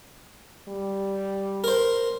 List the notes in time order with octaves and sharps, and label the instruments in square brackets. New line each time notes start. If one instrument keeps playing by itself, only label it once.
[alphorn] G3
[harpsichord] A#4 C5